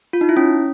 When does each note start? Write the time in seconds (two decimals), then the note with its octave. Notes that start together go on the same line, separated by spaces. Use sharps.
0.13 F4
0.21 D#4
0.29 E4
0.37 C#4